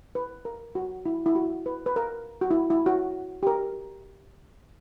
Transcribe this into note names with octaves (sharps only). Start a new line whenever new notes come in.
B4
A#4
F#4
E4
E4
F#4
B4
B4
A#4
F#4
E4
E4
F#4
G4
A#4